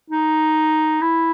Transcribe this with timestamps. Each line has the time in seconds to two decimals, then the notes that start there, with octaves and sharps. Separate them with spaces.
0.10 D#4
1.01 E4